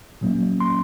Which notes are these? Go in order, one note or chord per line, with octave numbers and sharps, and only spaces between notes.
A#2 F#3 A#3 C#4
C6